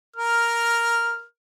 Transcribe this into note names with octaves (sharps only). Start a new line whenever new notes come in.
A#4 F6